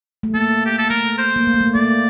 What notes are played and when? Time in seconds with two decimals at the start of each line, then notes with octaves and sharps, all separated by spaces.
0.23 A3
0.34 A#3 A4
0.66 G4
0.79 A4
0.90 A3 A#4
1.18 C5
1.36 A#3
1.47 A3
1.54 A#3
1.61 A3
1.74 A#3 D5